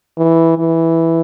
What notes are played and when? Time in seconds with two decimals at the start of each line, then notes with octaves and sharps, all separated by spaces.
0.18 E3
0.58 E3